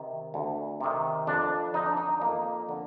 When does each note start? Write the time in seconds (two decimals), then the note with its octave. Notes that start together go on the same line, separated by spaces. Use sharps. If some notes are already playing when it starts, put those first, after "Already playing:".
Already playing: C3 D#3
0.34 D2
0.81 C3 D#3
1.27 F2 D4
1.74 D3 D#4
1.86 D4
1.97 D#4
2.21 F2 A#3
2.69 D3